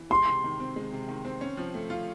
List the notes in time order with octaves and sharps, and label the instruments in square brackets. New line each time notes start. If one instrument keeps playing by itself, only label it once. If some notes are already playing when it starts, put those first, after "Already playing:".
Already playing: [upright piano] E3
[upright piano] G#3 [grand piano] C6
[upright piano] C3
D#3
C4
G#3
C3
D#3
C4
C#4
F3
A3
F4